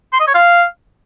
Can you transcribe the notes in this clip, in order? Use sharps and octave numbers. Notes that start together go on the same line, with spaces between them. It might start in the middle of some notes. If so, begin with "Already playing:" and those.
C6
D#5
C#5
F5